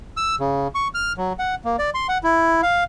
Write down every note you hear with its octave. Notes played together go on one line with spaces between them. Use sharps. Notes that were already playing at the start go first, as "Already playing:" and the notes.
E6
C#3
C#6
F6
F#3
F#5
A#3
D5
C6
F#5
E4
F5